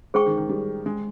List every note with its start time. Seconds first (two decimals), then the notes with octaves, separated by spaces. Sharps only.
0.14 G#3 G#4 C5 G5 C#6
0.26 D#3
0.37 D#3
0.49 G3
0.86 G#3